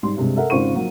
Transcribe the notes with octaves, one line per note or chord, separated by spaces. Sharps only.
G#2 G3 C6
G2 C3 G#3
A4 A#4 E5 F#5
G#1 C#3 F4 C5 C#6 D#7
F3 F#3 A#3